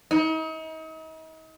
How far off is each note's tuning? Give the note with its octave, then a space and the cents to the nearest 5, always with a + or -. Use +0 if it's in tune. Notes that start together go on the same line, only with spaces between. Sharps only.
D#4 +40